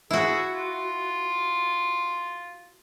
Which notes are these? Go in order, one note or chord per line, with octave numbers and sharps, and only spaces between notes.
E4 F#4 G#4
F4